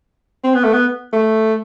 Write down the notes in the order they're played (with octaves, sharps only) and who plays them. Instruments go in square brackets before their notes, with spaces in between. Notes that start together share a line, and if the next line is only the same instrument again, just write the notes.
[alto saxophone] C4
B3
A3
B3
A3